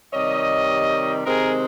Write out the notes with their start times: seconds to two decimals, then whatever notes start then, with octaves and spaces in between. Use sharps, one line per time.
0.13 C3 D#3 G3 C#5 D#5
1.26 C3 D#3 G#3 C4 G#4 A#4